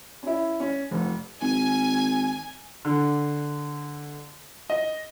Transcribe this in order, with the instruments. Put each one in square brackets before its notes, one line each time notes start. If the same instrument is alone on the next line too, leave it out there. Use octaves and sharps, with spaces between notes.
[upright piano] C#4 E4
C#4
F1
[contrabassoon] G#1 [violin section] G#5
[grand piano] D3
D#5